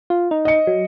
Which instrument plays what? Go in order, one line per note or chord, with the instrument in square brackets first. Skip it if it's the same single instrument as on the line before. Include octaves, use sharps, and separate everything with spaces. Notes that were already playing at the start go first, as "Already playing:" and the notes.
[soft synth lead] F4
D#4
[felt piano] D#5 C#7
[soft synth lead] F#3